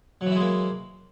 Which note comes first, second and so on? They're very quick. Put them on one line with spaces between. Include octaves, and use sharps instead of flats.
F#3 E3 E4 G#3 A#3